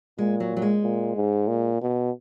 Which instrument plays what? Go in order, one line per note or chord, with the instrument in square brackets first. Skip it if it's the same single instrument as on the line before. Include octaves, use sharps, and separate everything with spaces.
[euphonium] A#2 [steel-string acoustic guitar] G#3
[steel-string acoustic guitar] F#3
F#3
G#3
[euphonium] A#2
G#2
A#2
B2